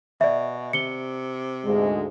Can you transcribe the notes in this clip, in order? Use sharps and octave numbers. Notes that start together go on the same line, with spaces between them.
B2 D5 E5
C3 C#7 G7
D2 G#2 G#3